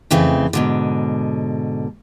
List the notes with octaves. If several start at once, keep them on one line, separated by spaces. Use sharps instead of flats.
F2 C#3 E3 A3 C4
G#2 B2 D3